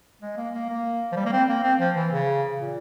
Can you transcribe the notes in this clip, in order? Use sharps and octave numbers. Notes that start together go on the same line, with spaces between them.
G#3
A#3
A#3
A#3
F3
G3
A#3
C4
A#3
C4
F3
E3
C#3
A#2